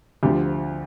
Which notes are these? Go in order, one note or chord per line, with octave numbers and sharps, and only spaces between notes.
D2 D3 F3 G4